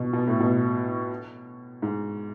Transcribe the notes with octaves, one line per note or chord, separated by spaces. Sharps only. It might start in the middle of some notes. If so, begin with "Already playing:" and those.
Already playing: B2
B2
A2
B2
G#2